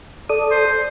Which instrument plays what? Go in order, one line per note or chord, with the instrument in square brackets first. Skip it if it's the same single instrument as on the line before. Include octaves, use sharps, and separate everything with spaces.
[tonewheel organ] A4 D5 D#6
[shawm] C5